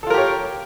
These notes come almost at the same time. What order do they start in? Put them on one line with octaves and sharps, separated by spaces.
A4 F4 A#4 G4 C#5